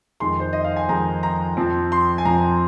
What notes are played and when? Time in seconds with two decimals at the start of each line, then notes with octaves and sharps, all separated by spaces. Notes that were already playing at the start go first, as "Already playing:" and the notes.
0.20 F2 D#3 G#3 D#4 C6
0.40 C5
0.53 D#5
0.65 F5
0.76 G#5
0.89 F2 D#3 G#3 D#4 A#5
1.23 A#5
1.57 F2 F3 C4
1.92 C6
2.18 G#5
2.25 F2 F3 C4 A#5